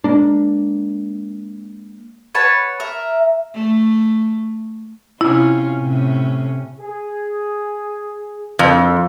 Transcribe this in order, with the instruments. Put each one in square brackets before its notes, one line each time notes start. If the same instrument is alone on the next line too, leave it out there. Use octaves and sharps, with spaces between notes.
[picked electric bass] G#3 A#3 D4
[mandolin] B4 C#5 F#5 A5
A#4 E5
[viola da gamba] A3
[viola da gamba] C3 C#4 F4 [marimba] E4
[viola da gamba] A2 C3 C#4
[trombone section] G#4
[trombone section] G#1 E4 A4 [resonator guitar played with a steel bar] F2